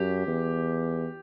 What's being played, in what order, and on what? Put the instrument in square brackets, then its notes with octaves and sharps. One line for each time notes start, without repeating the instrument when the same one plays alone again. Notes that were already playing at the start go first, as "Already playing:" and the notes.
Already playing: [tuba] F#2 [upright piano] G4
[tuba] E2